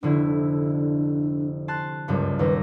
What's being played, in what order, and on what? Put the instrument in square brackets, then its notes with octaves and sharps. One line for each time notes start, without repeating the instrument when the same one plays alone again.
[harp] F1 D3 E4 [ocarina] D4
[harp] A5 C6 F#6
F#1 C#2 G2
[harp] D#2 C4 A#6 [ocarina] B4